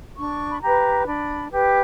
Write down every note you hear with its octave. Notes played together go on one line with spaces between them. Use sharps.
D4 C#6
B5
G4 B4 A#5
D4 B5
G4 B4